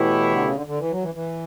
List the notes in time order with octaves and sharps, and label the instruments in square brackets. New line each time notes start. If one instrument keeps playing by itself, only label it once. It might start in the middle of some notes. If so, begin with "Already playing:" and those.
Already playing: [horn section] B2 A3 E4 G4 C#5 [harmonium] E3
[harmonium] D3
C#3
D3
D3
E3
F#3
E3
E3